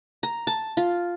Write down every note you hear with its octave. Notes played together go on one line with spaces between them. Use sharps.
A#5
A5
F4